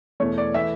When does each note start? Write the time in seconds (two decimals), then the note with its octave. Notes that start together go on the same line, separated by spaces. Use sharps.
0.20 E2 B2 A3 C#5
0.38 D5
0.54 E3 A3 E5